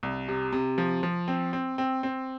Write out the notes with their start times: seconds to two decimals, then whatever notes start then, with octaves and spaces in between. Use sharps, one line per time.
0.03 C2
0.28 C3
0.53 C3
0.78 F3
1.03 F3
1.28 C4
1.53 C4
1.78 C4
2.03 C4